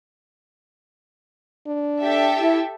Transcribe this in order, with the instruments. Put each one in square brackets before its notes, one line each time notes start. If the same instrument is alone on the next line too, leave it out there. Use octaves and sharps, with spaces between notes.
[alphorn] D4
[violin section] G4 A4 E5
[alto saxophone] E4